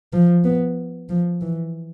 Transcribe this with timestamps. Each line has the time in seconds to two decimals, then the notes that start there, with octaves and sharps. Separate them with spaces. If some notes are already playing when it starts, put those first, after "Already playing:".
0.13 F3
0.44 B3
1.09 F3
1.41 E3